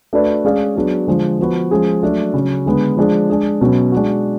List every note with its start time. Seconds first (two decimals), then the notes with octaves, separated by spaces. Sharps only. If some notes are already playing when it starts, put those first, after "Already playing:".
0.13 A3 D4 F#4 B4 D5
0.45 G#3 C#4 G#4 D5 F5
0.76 F#3 B3 D4 G#4
1.07 D3 F3 G#3
1.39 F3 B3 F#4 B4
1.71 F3 G#3 C#4 G#4
2.03 F#3 A3 D4
2.34 C#3 F#3 C#4
2.66 D3 G#3 B3
2.97 F3 G#3 D4 G#4
3.29 G#3 D4 G#4
3.61 B2 F#3 C#4
3.92 G#3 D4 F#4